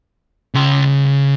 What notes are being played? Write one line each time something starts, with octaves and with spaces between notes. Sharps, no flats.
C#3 C6